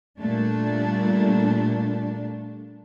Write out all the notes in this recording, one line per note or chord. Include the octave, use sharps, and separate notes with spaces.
A#2 G3 A3 D4